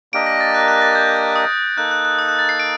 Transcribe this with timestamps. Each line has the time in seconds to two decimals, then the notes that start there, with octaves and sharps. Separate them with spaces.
0.13 A#3 D4 G4 A#4 D#5 D7
0.26 A#6
0.40 A6
0.54 F#6
0.68 F#6
0.82 A6
0.95 G6
1.36 D#6
1.77 A#3 D#4 A4 F#6
1.91 F#6
2.05 F#6
2.19 D#6
2.28 F#6
2.39 A6
2.49 C7
2.59 D7